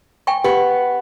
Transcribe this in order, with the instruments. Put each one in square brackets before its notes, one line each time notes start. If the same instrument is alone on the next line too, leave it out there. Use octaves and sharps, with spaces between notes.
[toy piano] G5 G#5 C#6
[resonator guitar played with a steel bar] B3 [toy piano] G4